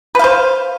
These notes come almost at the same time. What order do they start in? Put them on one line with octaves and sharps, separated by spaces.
B4 F5 C5